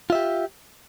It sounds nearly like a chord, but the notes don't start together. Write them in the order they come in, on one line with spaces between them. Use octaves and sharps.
F4 E5 G4